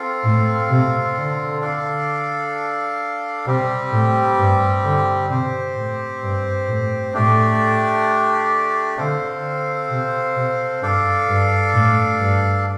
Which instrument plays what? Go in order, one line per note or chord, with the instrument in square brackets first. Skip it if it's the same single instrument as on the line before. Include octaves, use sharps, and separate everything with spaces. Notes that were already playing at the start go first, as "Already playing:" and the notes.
Already playing: [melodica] C4 F4 A4 F5
[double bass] A2
C3
D3
[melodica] D4 A4 D5 F5
[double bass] C3 [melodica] G3 C4 G4
[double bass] A2
G2
D3
[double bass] C3 [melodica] C4 G4 C5
[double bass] A2
G2
A2
[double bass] A2 [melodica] A3 D4 G4 D5
[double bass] D3 [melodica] C4 A4 C5 F5
[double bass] C3
C3
[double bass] G2 [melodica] D4 A4 D5 F5
[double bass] G2
A2
G2